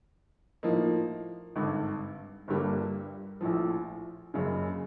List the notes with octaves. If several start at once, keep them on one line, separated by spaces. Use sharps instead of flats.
A2 F3 A#3 D#4
G#1 G2 D3
G1 G2 D3 G3 A#3
A#1 A2 F3
F#1 F#2 C#3